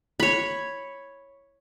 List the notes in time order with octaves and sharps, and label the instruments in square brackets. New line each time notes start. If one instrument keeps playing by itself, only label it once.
[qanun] C#5 B5